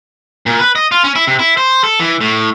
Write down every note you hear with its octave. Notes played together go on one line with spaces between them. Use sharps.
A#2
B4
D#5
F4
C#4
E4
C3
E4
C5
A4
E3
A2